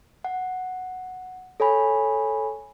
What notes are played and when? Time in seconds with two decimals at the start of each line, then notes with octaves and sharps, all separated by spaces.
0.24 F#5
1.60 A4 C#5 G#5 B5